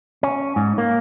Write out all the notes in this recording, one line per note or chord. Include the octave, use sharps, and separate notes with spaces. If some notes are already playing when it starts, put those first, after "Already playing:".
C#4
G#2
A#3